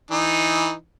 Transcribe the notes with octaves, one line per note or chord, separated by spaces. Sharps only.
E3 D#4